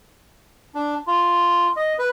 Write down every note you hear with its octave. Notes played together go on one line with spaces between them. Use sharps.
D4
F4
D#5
B4